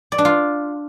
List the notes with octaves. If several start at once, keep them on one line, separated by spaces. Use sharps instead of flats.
D5
D4
F4